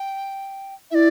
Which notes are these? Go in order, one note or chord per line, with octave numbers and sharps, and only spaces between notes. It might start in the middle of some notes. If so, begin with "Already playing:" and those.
Already playing: G5
E4 D5 E5